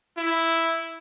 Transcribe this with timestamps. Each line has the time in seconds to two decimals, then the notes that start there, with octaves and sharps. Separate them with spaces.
0.17 E4